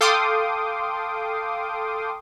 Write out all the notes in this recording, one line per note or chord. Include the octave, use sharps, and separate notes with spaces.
A4 F5 G5 C6 D6 D#6